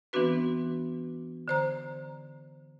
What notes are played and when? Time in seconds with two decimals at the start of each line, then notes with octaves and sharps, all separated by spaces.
0.13 E3 B3 C4 D4 F#4 B4
1.48 D3 C5 A#5